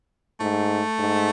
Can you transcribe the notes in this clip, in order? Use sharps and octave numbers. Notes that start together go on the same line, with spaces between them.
G#2 A3
G#2